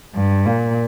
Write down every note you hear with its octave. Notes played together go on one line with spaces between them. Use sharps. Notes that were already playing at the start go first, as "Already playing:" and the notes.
G2
A#2